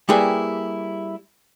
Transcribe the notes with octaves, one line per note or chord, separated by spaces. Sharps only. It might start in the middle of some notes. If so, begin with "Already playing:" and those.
G3 A#3 E4 G4 G#4 B4